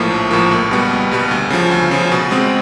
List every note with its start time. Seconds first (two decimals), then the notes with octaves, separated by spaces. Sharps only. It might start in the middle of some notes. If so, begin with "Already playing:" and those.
Already playing: A#1 A2 F3 A#3
0.11 A#1
0.31 A2 F3 A#3
0.51 C#2
0.71 B2 G3 B3
0.91 C#2
1.11 B2 G3 B3
1.31 D2
1.50 C#3 F3
1.71 D2
1.91 C#3 F3
2.12 B2
2.31 G#3 C4